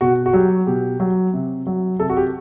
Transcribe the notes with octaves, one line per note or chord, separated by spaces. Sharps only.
B2 F#4
F#4
F#3 G4
B2 G4
F#3
C3
F#3
C3 A4
F#4
G4